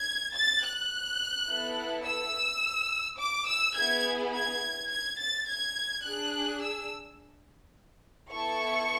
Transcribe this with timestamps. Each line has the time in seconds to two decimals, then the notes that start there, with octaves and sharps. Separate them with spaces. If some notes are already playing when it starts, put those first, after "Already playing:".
Already playing: G#6
0.34 A6
0.63 F#6
1.48 B3 E4 A4
2.05 E6
3.19 D6
3.47 E6
3.75 B3 E4 G#4 G#6
4.33 G#6
4.89 G#6
5.19 A6
5.47 G#6
6.03 D4 G#4 F#6
6.61 E6
8.31 B3 E4 A4 C#6